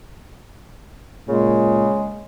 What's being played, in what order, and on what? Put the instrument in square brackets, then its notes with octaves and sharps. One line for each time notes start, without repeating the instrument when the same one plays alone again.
[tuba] A#2 [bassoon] C#3 [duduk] G#3